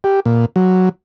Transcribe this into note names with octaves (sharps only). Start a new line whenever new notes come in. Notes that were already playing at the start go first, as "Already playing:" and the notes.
G4
A#2
F#3